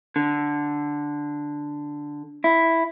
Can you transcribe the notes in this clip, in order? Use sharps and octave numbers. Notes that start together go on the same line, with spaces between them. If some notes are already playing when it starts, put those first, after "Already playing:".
D3
E4